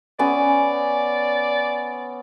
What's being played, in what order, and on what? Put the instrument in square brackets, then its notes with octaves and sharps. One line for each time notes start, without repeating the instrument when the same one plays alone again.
[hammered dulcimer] B3 C#4 G#5 [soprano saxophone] D5